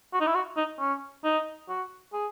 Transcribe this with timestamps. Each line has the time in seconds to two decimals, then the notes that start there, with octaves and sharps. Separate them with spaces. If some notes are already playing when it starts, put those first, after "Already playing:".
0.13 F#4
0.20 D#4
0.27 E4
0.35 F#4
0.57 D#4
0.79 C#4
1.24 D#4
1.69 F#4
2.13 G#4